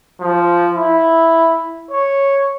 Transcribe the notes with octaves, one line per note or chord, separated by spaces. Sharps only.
F3
E4
C#5